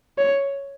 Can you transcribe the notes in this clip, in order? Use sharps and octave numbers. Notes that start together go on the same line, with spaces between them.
C#5